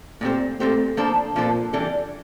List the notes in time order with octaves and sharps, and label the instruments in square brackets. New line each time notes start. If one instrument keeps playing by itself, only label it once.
[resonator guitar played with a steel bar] A#2 F3 C4 G4 C5 [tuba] A3
[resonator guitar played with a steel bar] A#2 F3 C4 G4 C5 [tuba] A3
[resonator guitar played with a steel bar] F3 A#3 D4 A4 C5
[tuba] A#2 [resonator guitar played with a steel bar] F3 A#3 D4 A4 C5
[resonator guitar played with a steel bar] E3 G3 D4 A4